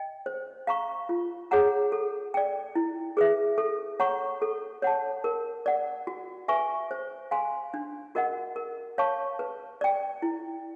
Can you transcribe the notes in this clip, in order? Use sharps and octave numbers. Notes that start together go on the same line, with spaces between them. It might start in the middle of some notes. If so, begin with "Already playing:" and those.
Already playing: D#5 G5
C5
F5 A#5 C#6
F4
G#4 C#5 F#5 A#5
A4
D5 G5
E4
G#4 B4 E5
A4
C#5 F#5 A#5 C#6
A4
C#5 F#5 A5
A#4
D5 F#5
F#4
B4 E5 G#5 C#6
C5
F5 G#5 C6
D4
F#4 A#4 D#5 F#5
A#4
C#5 F5 A5 C#6
B4
D5 G5
E4